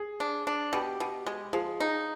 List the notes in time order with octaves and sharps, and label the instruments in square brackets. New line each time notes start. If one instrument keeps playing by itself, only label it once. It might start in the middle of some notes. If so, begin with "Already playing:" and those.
Already playing: [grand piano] G#4
[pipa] D4
D4
[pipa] B2 [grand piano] G4
[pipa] B2
G#3
[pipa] F3 [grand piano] G#4
[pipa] D#4